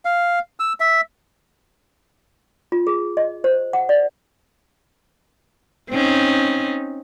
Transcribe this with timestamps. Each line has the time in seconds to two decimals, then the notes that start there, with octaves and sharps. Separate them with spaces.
0.05 F5
0.60 E6
0.80 E5
2.72 F4
2.87 G#4
3.17 D#5
3.44 C5
3.73 F#5
3.89 D5
5.91 C4 C#4 D#4